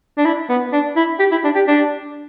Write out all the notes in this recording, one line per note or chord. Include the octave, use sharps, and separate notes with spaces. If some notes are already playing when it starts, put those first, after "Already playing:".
D4
E4
B3
D4
E4
G4
E4
D4
G4
D4